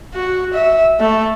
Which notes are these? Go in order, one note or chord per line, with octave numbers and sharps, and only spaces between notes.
F#4
E5
A3